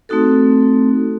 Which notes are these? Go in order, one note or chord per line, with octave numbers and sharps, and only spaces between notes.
A3 C4 D#4 F#4 A4